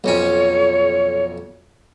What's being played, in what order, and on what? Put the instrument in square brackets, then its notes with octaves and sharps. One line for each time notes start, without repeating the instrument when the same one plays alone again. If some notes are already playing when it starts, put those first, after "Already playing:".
[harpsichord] B1 F2 C#4 [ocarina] C#5